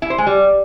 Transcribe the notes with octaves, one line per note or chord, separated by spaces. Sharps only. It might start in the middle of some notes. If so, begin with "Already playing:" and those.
E4
C5
G#3
G3